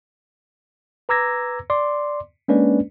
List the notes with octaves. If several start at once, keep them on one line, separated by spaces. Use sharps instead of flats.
B4 A#5 D6 E6 G#6 A#6
D5 C6 D6
G#3 A#3 C#4 D4 B4 D5